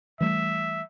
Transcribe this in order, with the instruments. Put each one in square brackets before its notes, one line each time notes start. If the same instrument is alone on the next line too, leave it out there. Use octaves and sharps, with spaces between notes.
[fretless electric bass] E3 G3 A3 [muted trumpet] E5